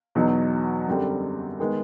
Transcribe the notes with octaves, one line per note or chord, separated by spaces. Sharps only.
E2 B2 F#3 B3 D#4
F#2 D3 G3 C4
D#3 G#3 B3